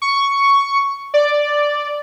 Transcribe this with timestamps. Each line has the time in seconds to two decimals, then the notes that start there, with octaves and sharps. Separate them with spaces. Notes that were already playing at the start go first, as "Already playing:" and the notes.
0.02 C#6
1.14 D5